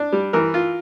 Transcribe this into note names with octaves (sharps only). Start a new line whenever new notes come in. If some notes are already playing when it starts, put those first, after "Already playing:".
Already playing: D4
G3
E3 A#4
F4